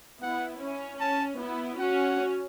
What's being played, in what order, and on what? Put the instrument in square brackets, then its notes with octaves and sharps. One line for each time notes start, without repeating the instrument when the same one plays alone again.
[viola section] B3 E4 [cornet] F#5
[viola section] C#4
[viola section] C#4 [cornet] A5
[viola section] B3 E4
[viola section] C#4 F#4 [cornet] F#5